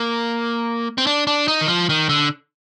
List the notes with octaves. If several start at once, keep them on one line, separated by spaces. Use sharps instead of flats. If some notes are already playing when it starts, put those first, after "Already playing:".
Already playing: A#3
C4
D4
D4
D#4
D#3
F3
D#3
D3